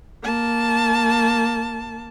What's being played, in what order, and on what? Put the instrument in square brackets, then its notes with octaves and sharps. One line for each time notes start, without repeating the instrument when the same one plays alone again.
[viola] A#3 A5